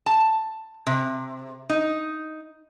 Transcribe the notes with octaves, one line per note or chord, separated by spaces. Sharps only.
A5
C3
D#4